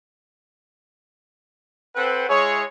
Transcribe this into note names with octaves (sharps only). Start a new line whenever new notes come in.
C4 A4 B4 C5 F#5 G5
G#3 E4 G#4 C#5